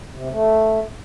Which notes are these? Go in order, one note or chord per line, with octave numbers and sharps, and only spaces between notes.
C3
A3